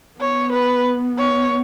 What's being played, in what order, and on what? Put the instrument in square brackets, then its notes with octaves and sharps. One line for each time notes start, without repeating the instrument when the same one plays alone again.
[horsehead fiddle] B3 [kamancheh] C#5
[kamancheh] B4
C#5